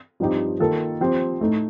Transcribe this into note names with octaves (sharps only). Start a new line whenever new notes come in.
G2 F3 C4 D#4 G4
D#3 A#3 F4 A4
F3 C4 G4
A2 A3 D#4